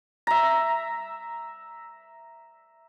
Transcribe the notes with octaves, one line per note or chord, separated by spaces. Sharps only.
E5 A#5